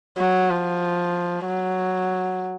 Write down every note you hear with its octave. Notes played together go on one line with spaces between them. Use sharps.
F#3
F3
F#3